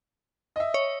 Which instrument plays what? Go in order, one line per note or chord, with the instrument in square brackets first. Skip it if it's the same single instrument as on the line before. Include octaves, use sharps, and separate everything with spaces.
[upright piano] D#5 E5
[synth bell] C#5